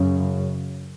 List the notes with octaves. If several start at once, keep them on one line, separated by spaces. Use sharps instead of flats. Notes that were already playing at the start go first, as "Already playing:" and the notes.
Already playing: F#2 C#3